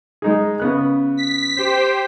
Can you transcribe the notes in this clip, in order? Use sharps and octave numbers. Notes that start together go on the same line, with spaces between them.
G#3 D#4 G#4
C#3 B3 F#6
B6
G4 C5